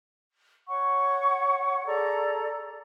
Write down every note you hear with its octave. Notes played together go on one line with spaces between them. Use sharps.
C#5 F#5 C#6
G#4 A4 D5 A#5